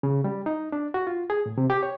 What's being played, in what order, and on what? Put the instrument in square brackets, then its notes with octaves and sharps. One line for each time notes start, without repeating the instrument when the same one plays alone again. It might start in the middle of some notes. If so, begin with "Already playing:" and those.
[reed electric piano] C#3
G3
D#4
D4
F#4
F4
G#4
A2
C3
G4
C#5